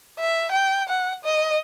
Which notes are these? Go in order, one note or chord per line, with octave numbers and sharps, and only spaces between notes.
E5
G5
F#5
D#5